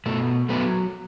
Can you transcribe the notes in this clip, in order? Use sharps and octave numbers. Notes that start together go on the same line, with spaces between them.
B2 A3
F#3 A3 B3